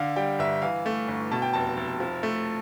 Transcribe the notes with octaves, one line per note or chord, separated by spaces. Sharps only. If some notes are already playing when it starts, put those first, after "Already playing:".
Already playing: D3 F5
G3 G5
G1 E5
E3 F5
A3
G1
B2 A5
G5
F1 A5
F1
F3
A3